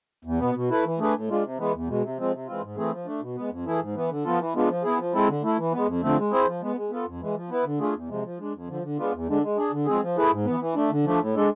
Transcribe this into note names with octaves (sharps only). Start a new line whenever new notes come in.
E2
B2 B3
B2
A3 E4 B4
E3
A3 D4 G#4 B4
A2
G#3 D4 F4
C3
E3 G#3 B3
E2
B2 G#3
C3
F3 G#3 C4
C3
E3 G#3 C4 F4
G#2
E3 A3 C4 G#4
F3
A3 D4
B2
G#3 B3
F2
E3 A3 E4 G#4
G#2
E3 B3
D3
F3 B3 F4 A4
E3
G#3 B3 D4 F4
F3
B3 E4 G#4
F3
G#3 C4 E4 A4
D3
A3 E4 A4
E3
G#3 B3
F2
D3 F3 A3 C4
G#3
C4 E4 G#4 C5
F3
G#3 B3
G#3
B3 F4 A4
F2
E3 G#3
F3
B3 E4 B4
D3
A3 D4 F4 G#4
E2
C3 F3 G#3
F3
G#3 D4
F2
D3 F3
D3
G#3 B3 D4 F4
E2
D3 G#3 D4
G#3
D4 G#4
D3
F3 G#3 C4 G#4
F3
A3 E4 G#4 B4
G#2
E3 B3
E3
A3 D4
D3
F3 A3 D4
A2
G#3 D4 A4